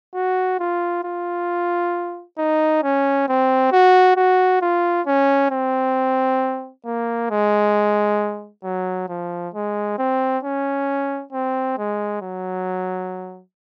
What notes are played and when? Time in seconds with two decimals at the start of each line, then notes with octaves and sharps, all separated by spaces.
0.14 F#4
0.59 F4
1.04 F4
2.38 D#4
2.83 C#4
3.28 C4
3.72 F#4
4.17 F#4
4.62 F4
5.07 C#4
5.51 C4
6.85 A#3
7.31 G#3
8.64 F#3
9.09 F3
9.54 G#3
9.98 C4
10.44 C#4
11.33 C4
11.78 G#3
12.22 F#3